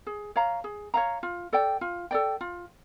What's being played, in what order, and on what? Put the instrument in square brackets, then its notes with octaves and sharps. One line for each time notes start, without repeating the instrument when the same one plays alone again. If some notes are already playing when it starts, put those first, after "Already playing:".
[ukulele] G#4
C#5 F5 A#5
G#4
C#5 F5 A#5
F4
A4 D5 G5
F4
A4 D5 G5
F4